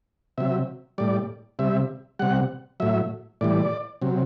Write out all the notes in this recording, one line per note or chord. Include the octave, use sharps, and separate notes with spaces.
C3 F#3 E5
A2 G3 D5
C3 G3 E5
C3 G3 F#5
A2 F#3 E5
A2 E3 G3 D5
C3 F#3